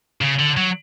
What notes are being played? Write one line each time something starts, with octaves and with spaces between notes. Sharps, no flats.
C#3
D3
F#3